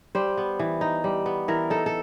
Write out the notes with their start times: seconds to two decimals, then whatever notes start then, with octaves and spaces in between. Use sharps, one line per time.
0.15 G3 C5
0.38 B3
0.59 E3
0.81 D#4
1.04 G3
1.26 B3
1.48 E3 A#4
1.70 D#4 A4
1.86 A4